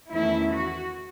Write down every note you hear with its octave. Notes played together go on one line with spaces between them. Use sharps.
E2 D#3 A3 C#4 E4
F#4